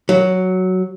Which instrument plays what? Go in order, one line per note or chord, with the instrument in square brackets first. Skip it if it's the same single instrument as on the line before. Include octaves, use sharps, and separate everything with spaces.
[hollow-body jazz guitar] F#3